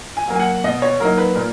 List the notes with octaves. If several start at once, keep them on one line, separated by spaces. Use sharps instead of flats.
G#5
F#3 A#3
G#5
F#5
B2 D#5
C#5
F#3 A#3 D#4 A#4
B4
A#2 A#4